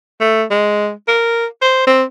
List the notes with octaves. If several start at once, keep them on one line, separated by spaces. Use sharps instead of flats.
A3
G#3
A#4
C5
C4